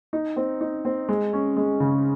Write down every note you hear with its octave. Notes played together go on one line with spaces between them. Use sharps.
D#4
C4
D#4
C4
G#3
C#4
G#3
C#3